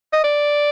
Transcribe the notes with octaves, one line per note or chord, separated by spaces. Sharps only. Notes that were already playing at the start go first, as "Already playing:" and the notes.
D#5
D5